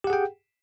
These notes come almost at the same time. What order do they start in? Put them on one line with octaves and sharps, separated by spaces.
G4 F#5 G#4 G5